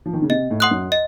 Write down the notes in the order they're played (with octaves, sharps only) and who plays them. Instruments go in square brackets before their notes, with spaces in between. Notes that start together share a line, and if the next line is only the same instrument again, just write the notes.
[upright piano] F3
D#3
C#3
[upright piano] C3 [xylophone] D#5
[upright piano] A2
[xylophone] F#5 C6 D#6 F#6
[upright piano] F#2
[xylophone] D#5